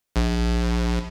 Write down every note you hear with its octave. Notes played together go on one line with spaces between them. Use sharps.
A#1